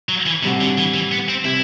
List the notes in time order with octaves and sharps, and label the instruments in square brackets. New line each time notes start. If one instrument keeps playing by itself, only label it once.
[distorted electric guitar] F#3
E3
[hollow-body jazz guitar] A2 G3 C4 F#4 [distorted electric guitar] C3
[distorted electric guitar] D3
E3
E3
B3
C4
[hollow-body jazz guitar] C3 G3 C4 [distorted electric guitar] E4